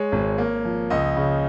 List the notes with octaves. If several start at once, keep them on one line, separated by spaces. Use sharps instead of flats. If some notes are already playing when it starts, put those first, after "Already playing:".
Already playing: G#3 C#5
G#1
A#3
F3
C#2 D#5
C#3